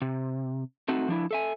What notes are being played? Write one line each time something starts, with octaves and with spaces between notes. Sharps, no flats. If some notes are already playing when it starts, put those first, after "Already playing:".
C3
A3 C4 D#4 F#4
F3 D4 E4
A4 E5 G#5